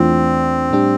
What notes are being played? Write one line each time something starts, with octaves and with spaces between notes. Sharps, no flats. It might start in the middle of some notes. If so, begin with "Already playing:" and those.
Already playing: E2 E3 A3 C4 D4 F4
A2 G3 D4 G4